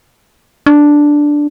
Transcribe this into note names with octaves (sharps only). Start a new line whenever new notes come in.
D4